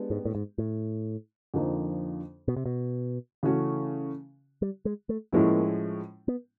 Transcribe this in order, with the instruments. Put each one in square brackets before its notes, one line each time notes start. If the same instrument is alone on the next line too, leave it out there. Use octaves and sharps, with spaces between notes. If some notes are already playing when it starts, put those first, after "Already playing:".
Already playing: [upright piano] G#3 B3 D4 G4
[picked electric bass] G#2
A2
G#2
A2
[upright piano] F2 D3 F3 A#3 D#4
[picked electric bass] B2
C3
B2
[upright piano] C#3 E3 A3 C#4 F#4
[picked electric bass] G3
G#3
A3
[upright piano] A2 F3 G#3 C#4 E4 [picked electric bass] A#3
[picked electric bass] B3